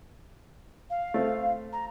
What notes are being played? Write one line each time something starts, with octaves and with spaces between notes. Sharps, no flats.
F5
A3 C4 F4
A#5